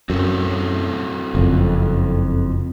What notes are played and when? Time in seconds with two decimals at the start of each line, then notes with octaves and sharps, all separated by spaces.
0.10 F#2 C4 F#4 A4
1.35 F#1 F2